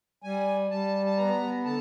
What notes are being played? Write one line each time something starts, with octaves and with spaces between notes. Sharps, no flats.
G3 G#5
G3 A5
A5
B3 A#5
D3 A5